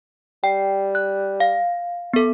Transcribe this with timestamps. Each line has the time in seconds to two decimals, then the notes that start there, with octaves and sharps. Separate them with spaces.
0.44 G3 G5
0.95 F#6
1.40 F5
2.13 B3 A4